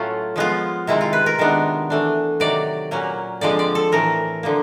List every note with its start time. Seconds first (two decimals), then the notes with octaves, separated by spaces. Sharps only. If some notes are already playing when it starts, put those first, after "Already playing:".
Already playing: A2 F#3 A3 C#4 F4
0.36 F3 G#3 B3 F4
0.87 C3 D#3 G#3 C4 E4
1.01 F4
1.13 B4
1.26 A#4
1.39 C3 D#3 G#3 B3 D4
1.90 E3 A3 D4
2.40 C3 D#3 F#3 D5
2.91 A#2 F#3 A#3 C#4
3.41 D3 F3 G#3 C4 D5
3.59 D5
3.75 A4
3.92 A2 E3 A3 A#4
4.43 D3 F3 A#3